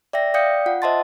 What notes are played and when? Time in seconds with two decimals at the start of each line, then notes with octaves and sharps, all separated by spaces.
0.13 D5 E5 G5 A#6
0.34 D5 F5 G5 D#6 G6 C#7
0.66 F4 F#5
0.82 C5 D#5 E5 A5 C6 A6